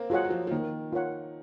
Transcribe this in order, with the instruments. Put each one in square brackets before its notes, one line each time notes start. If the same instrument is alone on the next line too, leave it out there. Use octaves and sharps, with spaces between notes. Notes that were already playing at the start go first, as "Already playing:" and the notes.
Already playing: [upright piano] A#3 C4
[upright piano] F#3 [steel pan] F4 G#4 C#5 F#5
[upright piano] F#3
F3
F3
[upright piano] D#3 [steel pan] A#3
[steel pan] F4 A#4 C#5 F#5